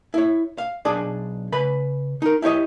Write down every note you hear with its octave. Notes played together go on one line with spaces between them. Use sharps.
E4 C#5
F5
B1 D4 G#4 D5
C#3 B4 B5
D#4 A#4
E4 G4 C#5 D#5